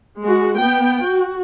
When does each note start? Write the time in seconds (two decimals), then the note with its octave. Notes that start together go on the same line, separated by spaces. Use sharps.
0.21 G#3 F#4
0.55 B3 G5
1.06 F#4